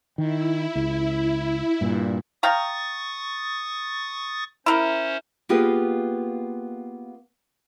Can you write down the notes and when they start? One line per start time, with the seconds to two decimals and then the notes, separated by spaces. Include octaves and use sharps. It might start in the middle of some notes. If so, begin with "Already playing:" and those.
0.18 D#3 E4
0.75 C#2
1.81 G2 A#2
2.43 F5 G5 A#5 C#6 D#6 A6
4.66 C#4 E4 A#4 C5
5.49 A#3 B3 F4 G4 G#4 B4